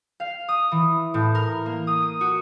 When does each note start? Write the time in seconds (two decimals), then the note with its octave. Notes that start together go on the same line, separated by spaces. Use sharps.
0.20 F5
0.49 D#6
0.72 E3
1.14 A2
1.35 A#4
1.66 A#3
1.87 D#6
2.02 D#7
2.21 F#4